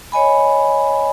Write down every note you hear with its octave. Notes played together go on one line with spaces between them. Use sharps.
C#5 D#5 G#5 B5